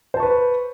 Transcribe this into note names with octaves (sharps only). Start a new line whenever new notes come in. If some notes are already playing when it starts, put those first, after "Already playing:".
B4 C5 A5 C#6